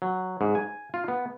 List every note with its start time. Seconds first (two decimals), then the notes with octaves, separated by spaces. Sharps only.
0.02 F#3
0.41 G#2
0.55 G#5
0.94 F4
1.08 B3